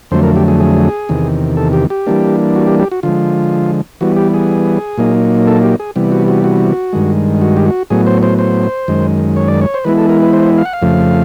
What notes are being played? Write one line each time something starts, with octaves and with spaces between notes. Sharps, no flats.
F2 D3 F#3 A3 C5
A#4
G4
G#4
G#4
E2 C3 D#3
A4
G4
G4
E3 G3 A#3 D4
F#4
G4
G4
F#4
D3 F3 G#3 F4
E3 G3 B3 F#4
G4
G#4
A#2 F#3 A#3 D#4
A4
G4
G#4
C3 E3 G3 B3
F#4
F#4
F#4
G2 D#3 G#3
F#4
G4
F#4
A2 F#3 B3 G#4
C5
C5
C5
F#2 D#3 G#3
C#5
D5
C#5
C5
E3 G#3 B3 E4 B4
A4
A#4
B4
C5
F5
F#5
F5
F2 C#3 F3 A3